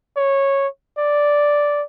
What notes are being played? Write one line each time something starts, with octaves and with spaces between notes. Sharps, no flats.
C#5
D5